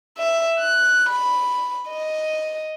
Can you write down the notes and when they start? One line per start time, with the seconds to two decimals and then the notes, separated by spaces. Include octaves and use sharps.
0.18 E5
0.59 F#6
1.09 B5
1.90 D#5